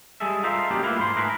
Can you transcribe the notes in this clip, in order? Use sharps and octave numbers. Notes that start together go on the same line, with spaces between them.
G3 G#3 G#4 A4 E5
F4 A4 A#4 C5 D#5 E5
G3 A#3 C#4 D#4 F#4 G4
A3 A#3 E4 F4 B4 F5
G#2 A#3 C5 C6
G#2 A3 G#4 A#4 B4